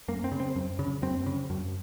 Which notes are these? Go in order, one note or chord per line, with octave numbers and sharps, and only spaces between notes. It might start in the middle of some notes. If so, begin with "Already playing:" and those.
F#2 A#3
C4
C#3
C4
F#2
C#3
F#2 C4
C#3
F#2